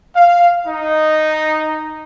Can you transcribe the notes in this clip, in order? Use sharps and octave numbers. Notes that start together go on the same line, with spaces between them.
F5
D#4